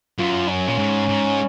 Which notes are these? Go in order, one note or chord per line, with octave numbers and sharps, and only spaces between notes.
F#2 F4
C#4
A#2
G#2
G#2